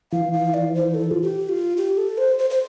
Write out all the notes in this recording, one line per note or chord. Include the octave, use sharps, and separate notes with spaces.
E3 F5
F5
D5
C5
A4
F4
G4
F4
G4
A4
C5
C5
C5